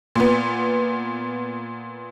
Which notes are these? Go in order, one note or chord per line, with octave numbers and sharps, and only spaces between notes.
A#2 B3